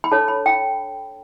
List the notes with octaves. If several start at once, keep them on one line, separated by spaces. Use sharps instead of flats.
B5
D4 A4 C#5 A5
B5
G5